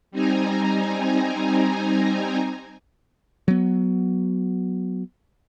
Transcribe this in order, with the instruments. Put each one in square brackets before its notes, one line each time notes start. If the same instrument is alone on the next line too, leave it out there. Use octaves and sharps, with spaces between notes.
[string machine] G3 C4 D#4 G#5 A#5
[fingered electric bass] F#3 B3